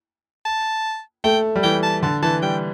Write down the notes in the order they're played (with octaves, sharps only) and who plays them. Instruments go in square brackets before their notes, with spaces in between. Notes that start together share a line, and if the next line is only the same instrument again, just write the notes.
[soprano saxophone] A5
[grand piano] A3 [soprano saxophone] G5
[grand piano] G3
[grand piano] E3 [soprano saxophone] G5
[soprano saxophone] A5
[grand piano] D3 [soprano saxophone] A5
[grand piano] E3 [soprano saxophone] A5
[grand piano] G3 [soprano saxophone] G5